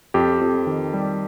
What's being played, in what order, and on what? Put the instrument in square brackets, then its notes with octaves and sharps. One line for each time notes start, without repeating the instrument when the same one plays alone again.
[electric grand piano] F2 G4
F2
D#3
G3